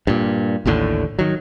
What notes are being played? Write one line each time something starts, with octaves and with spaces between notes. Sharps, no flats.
G2 A#2
A1 D#2 A2 D3
D#3 F#3